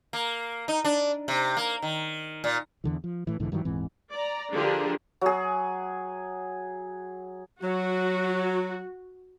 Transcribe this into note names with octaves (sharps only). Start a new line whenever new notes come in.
A#3
D#4
D4
C3
A#3
D#3
A#2
E2 D3 E3
F3
A2 E3
B1 G#2 D3 E3
G2 D#3 E3 F#3
D#1 G#2 E3 C4
D5 A#5
D3 F3 D4 G4 G#4 A#4
F#3 G#4
F#3 F#4